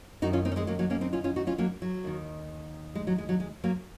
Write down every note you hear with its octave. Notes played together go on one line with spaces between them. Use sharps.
F#2 D#3 D#4 F#4
C#4 F4
C4 D#4
C#4
G#3 C4
F#3 A#3
F#3 A#3
A#3 C#4
C4 D#4
C#4 F4
C#4 F4
D#4 F#4
C#4 F4
F#3 A#3
F#3
D#2 D#3
G#3
F#3
G#3
F#3
G#3
F#3 A#3